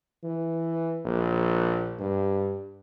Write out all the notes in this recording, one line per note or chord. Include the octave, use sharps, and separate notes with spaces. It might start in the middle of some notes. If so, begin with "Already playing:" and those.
E3
A#1
G2